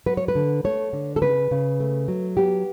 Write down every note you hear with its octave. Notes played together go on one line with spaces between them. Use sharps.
F#3 B4
C#5
B4
D3
A3 C#5
D3
A4
C#3 B4
C#3
A3
F#3
B3 G4